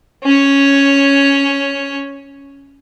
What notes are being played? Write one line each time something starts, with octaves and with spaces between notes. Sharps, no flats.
C#4 C#5